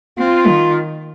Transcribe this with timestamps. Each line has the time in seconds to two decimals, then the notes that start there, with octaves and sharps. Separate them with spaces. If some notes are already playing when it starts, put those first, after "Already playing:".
0.19 C4 F4
0.47 D#3